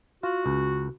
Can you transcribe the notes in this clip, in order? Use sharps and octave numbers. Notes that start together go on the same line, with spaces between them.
F4 F#4
C#2